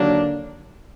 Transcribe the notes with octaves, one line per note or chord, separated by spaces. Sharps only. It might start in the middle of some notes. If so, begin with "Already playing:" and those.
Already playing: D#2 D3 F#3 A#3 D4